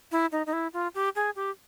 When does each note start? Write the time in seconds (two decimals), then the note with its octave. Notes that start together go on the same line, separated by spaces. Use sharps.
0.12 E4
0.32 D#4
0.46 D#4
0.53 E4
0.73 F4
0.95 G4
1.16 G#4
1.36 G4